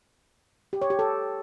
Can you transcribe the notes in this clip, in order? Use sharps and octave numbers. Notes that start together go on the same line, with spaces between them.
G4
C#5
G4
A4